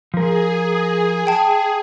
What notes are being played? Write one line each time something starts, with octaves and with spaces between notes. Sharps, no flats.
F3 G#4 A#4
G5 A5